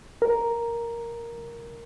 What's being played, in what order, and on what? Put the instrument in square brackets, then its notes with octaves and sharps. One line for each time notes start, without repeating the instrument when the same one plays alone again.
[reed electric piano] A#4